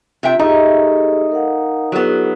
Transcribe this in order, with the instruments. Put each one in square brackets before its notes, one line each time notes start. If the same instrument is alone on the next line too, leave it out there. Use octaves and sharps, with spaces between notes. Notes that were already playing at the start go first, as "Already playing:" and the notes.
[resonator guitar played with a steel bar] C3 E5 G5 [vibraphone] F4
[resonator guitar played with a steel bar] A3 [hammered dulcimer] D#4 [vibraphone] G4 G#4
[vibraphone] A#4 F5 F#5
[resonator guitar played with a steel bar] F#3 B3 [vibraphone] F4 G4 A4